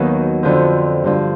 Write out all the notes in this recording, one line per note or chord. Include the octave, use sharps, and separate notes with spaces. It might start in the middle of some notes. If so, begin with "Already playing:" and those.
Already playing: D#2 D#3 F#3 B3
F2 D3 F3
G2 D3 F3